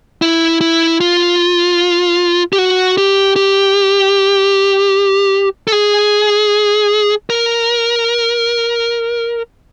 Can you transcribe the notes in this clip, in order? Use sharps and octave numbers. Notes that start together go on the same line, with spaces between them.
E4
E4
F4
G4
F#4
G4
G4
A4
G#4
A#4